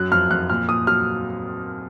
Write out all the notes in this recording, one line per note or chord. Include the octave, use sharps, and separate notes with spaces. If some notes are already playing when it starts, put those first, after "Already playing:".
Already playing: F#2 F#3 F#6
F2 F6
F2 F#6
A#2 F6
A#2 D#6
F#3 F6